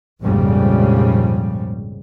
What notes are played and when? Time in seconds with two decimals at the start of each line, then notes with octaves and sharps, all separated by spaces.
0.21 A#1 F2 G#2 C#3 F3 G3